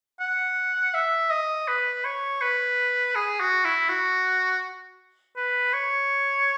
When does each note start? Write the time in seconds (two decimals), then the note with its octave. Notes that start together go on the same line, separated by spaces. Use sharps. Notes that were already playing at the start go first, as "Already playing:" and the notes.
0.20 F#5
0.94 E5
1.30 D#5
1.68 B4
2.05 C#5
2.42 B4
3.15 G#4
3.40 F#4
3.64 E4
3.89 F#4
5.36 B4
5.73 C#5